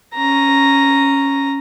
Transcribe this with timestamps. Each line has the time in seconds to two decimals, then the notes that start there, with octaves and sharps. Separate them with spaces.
0.14 C#4 A#5